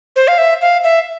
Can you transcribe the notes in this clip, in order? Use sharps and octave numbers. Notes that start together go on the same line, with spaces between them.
C5
F5
E5
F5
E5